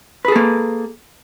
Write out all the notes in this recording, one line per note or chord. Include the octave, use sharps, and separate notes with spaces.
A#3 G#4 A4 B4